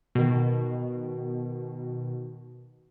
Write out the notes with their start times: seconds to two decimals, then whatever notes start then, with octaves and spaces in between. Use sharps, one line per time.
0.15 B2 D#3